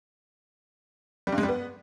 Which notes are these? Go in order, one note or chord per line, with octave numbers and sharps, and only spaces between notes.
G3
G2
G#3
G3
B3